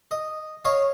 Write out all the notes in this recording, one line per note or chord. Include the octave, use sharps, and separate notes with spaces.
D#5
C#5 D#5 F5